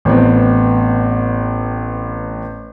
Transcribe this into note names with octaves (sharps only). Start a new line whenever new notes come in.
A1 B3 C4